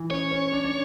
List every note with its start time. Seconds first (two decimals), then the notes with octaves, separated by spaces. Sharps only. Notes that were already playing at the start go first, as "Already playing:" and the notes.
Already playing: E3
0.11 C#4 C#5
0.31 C#4
0.53 D4
0.65 D4